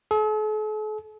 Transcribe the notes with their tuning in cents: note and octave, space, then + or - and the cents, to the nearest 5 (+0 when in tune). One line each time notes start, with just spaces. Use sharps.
A4 -45